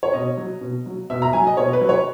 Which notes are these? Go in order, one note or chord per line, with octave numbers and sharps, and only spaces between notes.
C#5
B2 D#5
F#3
B2
F#3
B2 E5
A#5
F#3 G#5
D#5
B2 C#5
B4
F#3
C#5